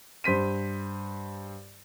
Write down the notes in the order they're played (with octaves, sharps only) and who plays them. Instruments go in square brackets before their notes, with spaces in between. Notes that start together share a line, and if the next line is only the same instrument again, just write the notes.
[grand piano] G2 C5 B6 D#7